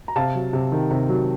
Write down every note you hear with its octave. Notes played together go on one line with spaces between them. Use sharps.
A#5
C3 F5 A5
F#3
C3
D#3
C3
F#3